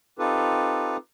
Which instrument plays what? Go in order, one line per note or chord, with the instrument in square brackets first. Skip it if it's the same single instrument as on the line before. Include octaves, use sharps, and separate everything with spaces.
[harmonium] C4 D#4 F4 G4 A4 B4